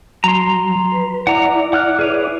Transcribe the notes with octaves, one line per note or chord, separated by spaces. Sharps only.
F#3 A#5 C6
B4
E4 D5 F#5 A#5
F#5 F6 F#6
G#4 B4 C#5